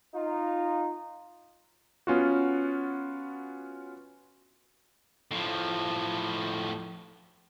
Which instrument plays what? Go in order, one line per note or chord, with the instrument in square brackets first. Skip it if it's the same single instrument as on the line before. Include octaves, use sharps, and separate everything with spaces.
[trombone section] D#4 F4
[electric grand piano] B3 C#4 F4 F#4
[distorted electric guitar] A2 F3